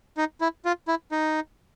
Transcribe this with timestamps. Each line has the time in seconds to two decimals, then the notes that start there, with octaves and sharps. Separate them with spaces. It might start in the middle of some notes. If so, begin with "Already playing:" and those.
0.17 D#4
0.41 E4
0.65 F4
0.88 E4
1.12 D#4